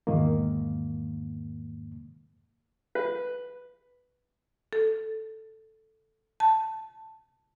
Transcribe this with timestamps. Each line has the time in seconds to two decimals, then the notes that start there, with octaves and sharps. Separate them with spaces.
0.07 E2 G#2 D#3 A#3
2.95 B4
4.73 A4
6.40 A5